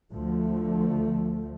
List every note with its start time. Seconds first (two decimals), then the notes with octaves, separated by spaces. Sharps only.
0.12 D2 D3 F3 A3